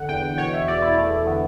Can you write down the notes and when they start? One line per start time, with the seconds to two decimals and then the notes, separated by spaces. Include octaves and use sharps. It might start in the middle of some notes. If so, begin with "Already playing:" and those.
Already playing: D3 F#5
0.09 E2 G5
0.38 B2 C#5
0.53 E5
0.68 E2 D5
0.82 E4
0.97 E2 A3
1.27 D3 B3